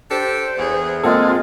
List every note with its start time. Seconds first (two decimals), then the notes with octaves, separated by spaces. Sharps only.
0.11 D4 G4 A4 C5
0.58 E2 G#4
1.04 G#3 A#3 C4 F4 A4